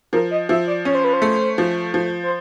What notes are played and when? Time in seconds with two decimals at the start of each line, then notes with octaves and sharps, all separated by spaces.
0.13 F3 A#4
0.31 D#5
0.49 F3 E5
0.67 D5
0.85 C#4 C#5
0.95 C5
1.04 B4
1.13 C5
1.22 A3
1.58 F3
1.94 F3
2.23 C5